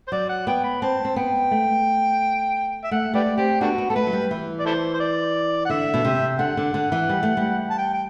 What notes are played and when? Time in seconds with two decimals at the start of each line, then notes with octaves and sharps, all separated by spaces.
0.07 C5
0.12 F#3 D5
0.29 F#5
0.47 B3 G5
0.64 B5
0.82 C4 A5
1.05 C4
1.16 B3 G5
1.51 A3
2.84 E5
2.91 A3 F#5
3.14 A3 G4 B4 D5
3.37 C4 G4
3.61 A3 B3 D4 F#4
3.78 B3
3.90 B3 A4
3.96 A3 B4
4.07 F#3
4.13 G3
4.31 E3
4.59 D5
4.66 E4 A4 C5
4.94 C5
5.00 D5
5.65 F#5
5.70 D3 E5
5.94 B2
6.05 C3
6.39 D3 F#5
6.57 D3
6.74 D3
6.92 E3
7.09 G3
7.23 A3
7.37 G3
7.70 A5
7.78 G5
7.94 G5